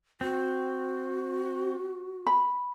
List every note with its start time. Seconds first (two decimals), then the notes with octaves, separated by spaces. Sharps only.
0.21 C4 F#4
2.27 B5